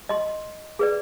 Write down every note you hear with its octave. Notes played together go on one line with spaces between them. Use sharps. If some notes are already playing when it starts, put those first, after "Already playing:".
D#5 C6
G#4 B4 D5